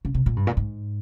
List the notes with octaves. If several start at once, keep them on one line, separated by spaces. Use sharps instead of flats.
C#3
C3
A#2
G2
A#2
G#2